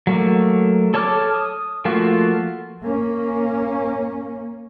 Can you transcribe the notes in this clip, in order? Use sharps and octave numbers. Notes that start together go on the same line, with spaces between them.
F#3 A3 A#3
A4 C#5 A5 D6 F6
D#6
F3 A3 A#3 F4 F#4
A#3 C#4